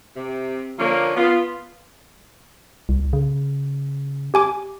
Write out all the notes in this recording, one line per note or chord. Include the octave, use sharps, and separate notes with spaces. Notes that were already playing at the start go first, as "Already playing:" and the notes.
C3
D3 F3 A#3 C#4
B3 F4
C2
C#3
G4 G#5 D6